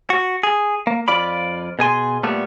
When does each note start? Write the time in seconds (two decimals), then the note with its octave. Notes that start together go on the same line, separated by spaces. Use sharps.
0.10 F#4
0.43 G#4
0.87 A#3
1.08 F2 F4 D5 B5
1.79 B2 G#4 G#5 C6
2.23 A#2 G3 A3 B3